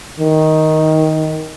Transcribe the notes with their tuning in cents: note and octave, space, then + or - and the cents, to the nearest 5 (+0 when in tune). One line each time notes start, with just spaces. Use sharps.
D#3 +10